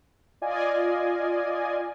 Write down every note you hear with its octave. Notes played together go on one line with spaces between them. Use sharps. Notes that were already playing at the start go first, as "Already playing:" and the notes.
F4 D5 D#5 F5 G#5